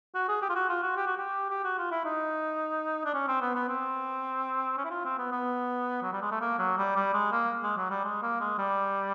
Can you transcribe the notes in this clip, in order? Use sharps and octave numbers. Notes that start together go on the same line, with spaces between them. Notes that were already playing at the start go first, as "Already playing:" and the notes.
F#4
G#4
G4
F4
F#4
F4
F#4
G4
F#4
G4
G4
F#4
F4
E4
D#4
D4
C#4
C4
B3
B3
C4
C#4
E4
F4
C4
B3
B3
F#3
G3
G#3
A3
A#3
F#3
G3
G3
G#3
A#3
G#3
F#3
G3
G#3
A#3
G#3
G3